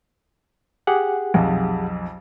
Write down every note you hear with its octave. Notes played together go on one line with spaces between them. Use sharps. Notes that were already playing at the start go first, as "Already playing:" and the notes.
G4 G#4 F#5
B1 F2